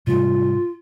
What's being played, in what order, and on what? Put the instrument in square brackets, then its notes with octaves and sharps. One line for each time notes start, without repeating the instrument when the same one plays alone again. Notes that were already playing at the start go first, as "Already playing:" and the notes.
[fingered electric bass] G#2 C3 G3 [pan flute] F4